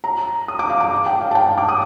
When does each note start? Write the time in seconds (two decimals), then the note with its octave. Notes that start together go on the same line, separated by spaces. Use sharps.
0.04 A#5
0.48 D#6
0.59 D6
0.70 F5
0.80 D6
1.06 G5
1.21 F5
1.31 A5
1.35 G5
1.47 G5
1.58 D6
1.69 D#6